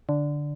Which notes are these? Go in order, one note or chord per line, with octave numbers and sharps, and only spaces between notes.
D3